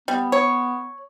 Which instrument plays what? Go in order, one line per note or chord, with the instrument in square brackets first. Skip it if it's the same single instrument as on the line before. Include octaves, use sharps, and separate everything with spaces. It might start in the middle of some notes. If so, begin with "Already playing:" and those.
[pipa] G3 [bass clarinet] B3
[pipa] C#5